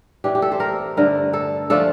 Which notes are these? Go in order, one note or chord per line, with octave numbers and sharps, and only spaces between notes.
E3 A3 D4 G4
G4
A4
C5
A#4
G2 D3 A3 A#4
A4
F3 A3 D4 F4 A4